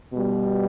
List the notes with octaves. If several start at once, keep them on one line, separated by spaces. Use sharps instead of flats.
B2 G3